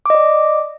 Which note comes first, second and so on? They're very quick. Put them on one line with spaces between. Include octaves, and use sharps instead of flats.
D6 D#5 D5